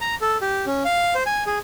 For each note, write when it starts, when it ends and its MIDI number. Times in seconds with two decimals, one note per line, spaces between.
0.01 0.15 82
0.21 0.37 69
0.41 0.65 67
0.66 0.83 61
0.85 1.14 77
1.15 1.23 72
1.26 1.44 80
1.46 1.59 68